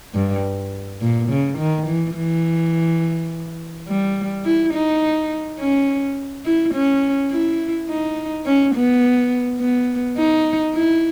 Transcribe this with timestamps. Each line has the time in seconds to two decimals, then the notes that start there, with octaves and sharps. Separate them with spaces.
0.15 G2
1.01 A#2
1.29 C#3
1.58 D#3
1.87 E3
2.16 E3
3.88 G3
4.45 E4
4.73 D#4
5.59 C#4
6.45 E4
6.74 C#4
7.31 E4
7.89 D#4
8.46 C#4
8.75 B3
9.60 B3
10.17 D#4
10.75 E4